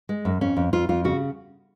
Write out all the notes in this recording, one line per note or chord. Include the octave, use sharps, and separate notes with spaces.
G#3
F#2
F2 C#4
F2
F2 F4
F2 F4
C#3 F#4